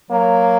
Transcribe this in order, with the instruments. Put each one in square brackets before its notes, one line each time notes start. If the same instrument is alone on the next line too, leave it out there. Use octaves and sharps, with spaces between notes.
[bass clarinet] F#3 [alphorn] A#3